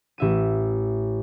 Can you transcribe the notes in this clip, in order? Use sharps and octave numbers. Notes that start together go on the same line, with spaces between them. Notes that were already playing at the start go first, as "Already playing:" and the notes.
A1 E5 D#7